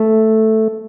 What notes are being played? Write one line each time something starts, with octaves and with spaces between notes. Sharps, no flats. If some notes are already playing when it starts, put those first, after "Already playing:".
Already playing: A3